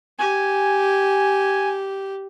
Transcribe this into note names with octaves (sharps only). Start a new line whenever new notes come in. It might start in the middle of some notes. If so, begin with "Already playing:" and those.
G4 G#5